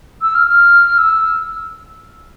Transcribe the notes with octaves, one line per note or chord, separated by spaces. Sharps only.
E6
F6
F6
E6